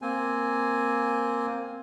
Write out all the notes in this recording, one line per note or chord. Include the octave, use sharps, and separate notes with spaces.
A#3 C4 G#5